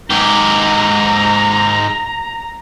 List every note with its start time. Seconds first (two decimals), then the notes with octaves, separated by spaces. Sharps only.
0.10 G#2 G4 A#5